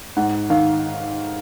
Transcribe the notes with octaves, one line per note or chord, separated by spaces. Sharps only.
G#2 F#5
D#3 F5